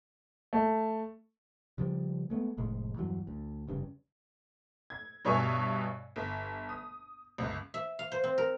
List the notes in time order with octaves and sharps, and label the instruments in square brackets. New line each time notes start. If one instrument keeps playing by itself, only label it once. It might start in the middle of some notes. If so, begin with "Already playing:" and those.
[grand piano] A3
[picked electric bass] C#3 F3 G3
G#3 A3 B3
F1 A2 G#3
E2 G2 E3 F#3
D2
F1 G2 C#3
[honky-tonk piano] G#6
G2 B2 C#5 E5 G#5 C#6
G1
D#6
G1 C#2
[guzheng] E5
F5
C5
C4
A#4